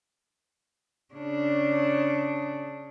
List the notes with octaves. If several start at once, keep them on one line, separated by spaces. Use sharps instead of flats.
C#3 D4